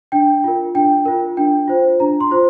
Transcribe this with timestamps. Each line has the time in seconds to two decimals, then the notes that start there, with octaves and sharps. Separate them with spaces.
0.12 D4 G5
0.44 F4 A#4
0.75 D4 G5
1.06 F4 A#4
1.37 D4 G5
1.68 F4 C5
2.00 D4 A#5
2.21 C6
2.31 F4 C5